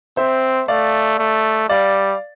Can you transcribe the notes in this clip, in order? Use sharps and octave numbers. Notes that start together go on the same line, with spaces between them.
C4 C5 E5
A3 D5 F5
A3
G3 D5 F5